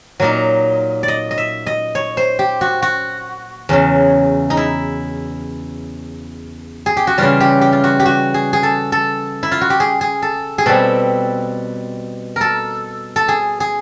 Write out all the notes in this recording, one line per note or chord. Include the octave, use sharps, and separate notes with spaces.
A#2 F#3 A#3 D#4
D5
D#5
D#5
E5
D#5
C#5
C5
G4
F#4
F#4
E2 C#3 F#3
D#4
E4
G#4
G4
F#4
C#3 E3 G3 F4
G4
G4
F4
F#4
G4
F#4
G#4
G#4
A4
A4
E4
F4
F#4
G4
G#4
G#4
A4
G#4
B2 G3 C4 A4
A4 A#4
A4
G#4
G#4